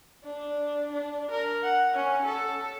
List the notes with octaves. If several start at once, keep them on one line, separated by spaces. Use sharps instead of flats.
D4
D4
A#4
F#5
C#4
A4